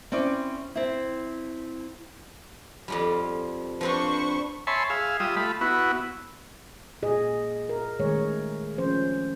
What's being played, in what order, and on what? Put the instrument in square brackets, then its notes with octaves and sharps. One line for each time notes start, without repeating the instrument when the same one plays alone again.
[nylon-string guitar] C4 C#4 E4 D5
C4 E4
[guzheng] F2 F3 G3
[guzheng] F3 C4 D4 [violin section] B4 C5 C#6
[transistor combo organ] C#5 E5 G#5 A5 B5 C6
G#4 E5 F5
G3 F4 E5 D#6
A3 F4 B5
B3 E4 F#4
[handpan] A#2 G#4 D#5
A#4
D#3 G#3 A3 G#4 C#5
F3 C#4 C5